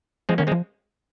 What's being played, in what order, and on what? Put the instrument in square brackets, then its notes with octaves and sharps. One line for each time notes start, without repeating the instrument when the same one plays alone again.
[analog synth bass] F3 [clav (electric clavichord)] G#3 C4
[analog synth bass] D#3 [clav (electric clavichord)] A#3 C#4
[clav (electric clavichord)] G#3 C4
[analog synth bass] F3